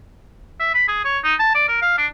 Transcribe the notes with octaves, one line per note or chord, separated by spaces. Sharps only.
E5
B5
G#4
C#5
D#4
A5
D5
A#4
F5
D4